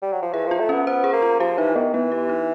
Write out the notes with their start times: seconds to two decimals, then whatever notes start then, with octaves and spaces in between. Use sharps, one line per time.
0.02 G3
0.13 F#3
0.23 F3
0.33 E3 G#4
0.46 F3 F4
0.60 A3
0.69 B3 C#4
0.87 B3 C5
1.04 G#4
1.13 A#3
1.22 F4
1.40 F3 G4
1.58 E3 D#4
1.76 D#3 B3
1.93 E3 B3
2.12 G4
2.29 D#4